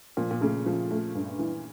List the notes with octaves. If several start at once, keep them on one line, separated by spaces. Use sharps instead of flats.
A#2 F3
A#2
C#3 A3
F3
A3
G2
E3